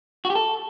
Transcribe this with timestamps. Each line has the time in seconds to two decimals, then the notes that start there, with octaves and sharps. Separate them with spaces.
0.25 F#4
0.30 G4
0.35 A4